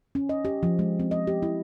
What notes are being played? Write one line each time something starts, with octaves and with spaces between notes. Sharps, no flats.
C#4
D#5
G4
F3
G#3
C4
D#5
G4
E4